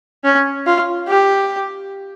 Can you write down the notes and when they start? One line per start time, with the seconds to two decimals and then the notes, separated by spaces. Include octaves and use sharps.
0.24 C#4
0.66 F4
1.08 G4